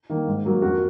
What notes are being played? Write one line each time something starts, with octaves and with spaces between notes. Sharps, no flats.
D#3 A#3
G#2
F#3 A#3
F2 F#4 A#4